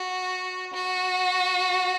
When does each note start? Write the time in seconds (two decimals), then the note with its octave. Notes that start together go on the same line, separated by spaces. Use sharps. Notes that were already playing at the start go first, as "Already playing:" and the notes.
Already playing: F#4
0.74 F#4